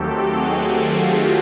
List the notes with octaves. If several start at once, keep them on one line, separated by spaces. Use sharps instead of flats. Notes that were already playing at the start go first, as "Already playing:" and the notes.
Already playing: D#2 D#3 F#3 A3 C4 G4 A4
F#4 G#4
F4